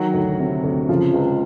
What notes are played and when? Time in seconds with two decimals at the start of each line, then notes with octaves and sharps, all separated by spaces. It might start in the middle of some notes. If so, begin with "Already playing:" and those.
Already playing: D#3 F#3 F#4
0.14 D2
0.39 C3
0.64 D2
0.89 C#3 F3 F4
1.14 C#2